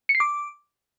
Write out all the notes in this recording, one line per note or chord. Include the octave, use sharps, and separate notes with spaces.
C#7
C7
D6